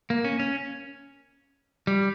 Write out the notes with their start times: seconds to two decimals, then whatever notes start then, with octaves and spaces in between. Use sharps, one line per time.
0.10 A#3
0.25 C#4
0.39 C#4
1.87 G3